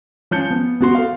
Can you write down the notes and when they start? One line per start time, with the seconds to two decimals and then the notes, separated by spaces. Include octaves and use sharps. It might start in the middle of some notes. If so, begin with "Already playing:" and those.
0.31 F3 C#4 A5 G6 C#7
0.50 B3
0.81 B3 F#4 C6
0.95 A4 F5